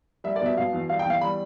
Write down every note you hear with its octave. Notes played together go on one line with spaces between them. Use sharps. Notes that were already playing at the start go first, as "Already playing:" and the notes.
G3 E5
D5
B2 E5
B2 F5
E2
G3 F5
G5
E2 F5
G3 B5